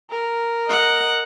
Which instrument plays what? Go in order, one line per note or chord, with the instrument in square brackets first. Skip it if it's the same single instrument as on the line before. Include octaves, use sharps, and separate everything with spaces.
[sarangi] A#4
[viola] D#5 F#5